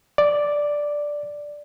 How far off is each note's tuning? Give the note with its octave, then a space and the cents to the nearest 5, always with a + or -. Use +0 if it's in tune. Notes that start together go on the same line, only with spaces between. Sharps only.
D5 +0